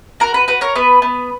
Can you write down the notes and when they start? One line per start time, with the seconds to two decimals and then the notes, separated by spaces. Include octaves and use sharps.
0.20 F#4 A#4
0.34 B4
0.48 F#4 B4
0.61 A#4 C#5
0.75 B3 B4
1.02 B3